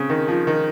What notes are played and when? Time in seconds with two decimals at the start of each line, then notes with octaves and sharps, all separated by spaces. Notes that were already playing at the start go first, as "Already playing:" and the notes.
Already playing: C#3 C4
0.10 D#3
0.28 F3
0.47 D#3